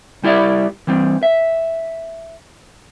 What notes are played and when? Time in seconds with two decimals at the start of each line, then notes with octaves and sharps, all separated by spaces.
0.23 G3 E4 G4 D5 E5
0.87 E3 G3 C4
1.23 E5